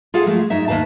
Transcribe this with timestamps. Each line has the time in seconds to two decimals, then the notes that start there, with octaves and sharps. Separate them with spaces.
0.14 F4 G#4 A4 F5 F#5
0.26 F3 F#3 G#3 A3
0.50 F#2 G#3 D#4 E5
0.68 D#2 A#2 B4 F5 A5